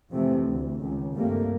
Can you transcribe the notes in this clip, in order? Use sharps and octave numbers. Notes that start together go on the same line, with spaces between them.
F1 C3 E3 F3 A3
D2 E3
C#2 D#3
C2 G2 G3 A3 A#3